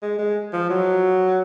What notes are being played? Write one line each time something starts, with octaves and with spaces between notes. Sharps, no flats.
G#3
G#3
F3
F#3